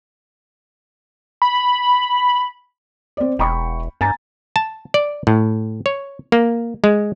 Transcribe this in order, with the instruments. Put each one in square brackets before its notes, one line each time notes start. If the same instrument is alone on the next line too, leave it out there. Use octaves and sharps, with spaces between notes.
[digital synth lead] B5
[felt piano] C4 D5
[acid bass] E1 [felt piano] G5 B5 C#6
[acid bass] G2 [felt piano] G#5 A#5 A6
[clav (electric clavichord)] A5
D5
A2
C#5
A#3
G#3